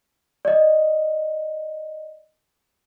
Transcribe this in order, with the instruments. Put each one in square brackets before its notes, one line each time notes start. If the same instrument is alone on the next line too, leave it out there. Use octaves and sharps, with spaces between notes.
[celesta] D5 D#5